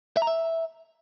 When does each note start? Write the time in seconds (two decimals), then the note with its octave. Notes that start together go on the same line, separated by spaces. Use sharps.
0.17 E5
0.22 A#5
0.27 E5